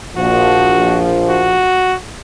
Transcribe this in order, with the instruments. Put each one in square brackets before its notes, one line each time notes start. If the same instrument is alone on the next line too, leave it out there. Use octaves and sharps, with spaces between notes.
[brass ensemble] A#1 F3 [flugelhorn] F#4
[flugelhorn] F#4